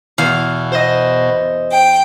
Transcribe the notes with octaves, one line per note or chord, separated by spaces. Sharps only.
E2 B2 F5
C5 D#5
G5